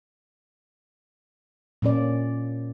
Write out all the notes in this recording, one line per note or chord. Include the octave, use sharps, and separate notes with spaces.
A#2 A#3 C#4 D5